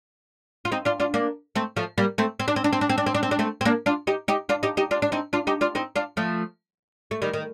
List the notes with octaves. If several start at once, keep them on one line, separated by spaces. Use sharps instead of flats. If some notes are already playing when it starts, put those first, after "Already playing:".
F4
C4 D#4
D4 F4
D4 F4
A#3 D4
A3 C4
F3 A3
G3 A#3
A3 C4
C4
D4
C4
D4
C4
D4
C4
D4
C4
D4
C4
D4
A3 C4
C4
A#3 D4
D4 F4
D#4 G4
D#4 G4
D4 F4
D#4 G4
D#4 G4
D4 F4
D4
C4 D#4
D4 F4
D#4 G4
D4 F4
C4 D#4
D4 F4
F3 A3
A3
D#3 G3
D#3